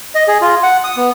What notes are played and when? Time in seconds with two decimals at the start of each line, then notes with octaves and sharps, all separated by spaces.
0.15 D#5
0.28 G#4
0.41 F4
0.63 F#5
0.84 D#6
0.97 B3